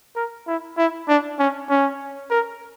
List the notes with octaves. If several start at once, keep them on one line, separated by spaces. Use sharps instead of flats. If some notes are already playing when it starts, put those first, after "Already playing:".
A#4
E4
E4
D4
C#4
C#4
A#4